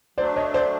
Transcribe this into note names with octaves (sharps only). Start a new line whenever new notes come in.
F#3 A3 D4 C5 D5
C#5 D#5
C5 D5